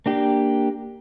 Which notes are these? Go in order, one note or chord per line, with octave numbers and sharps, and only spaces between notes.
A#3 D4 G4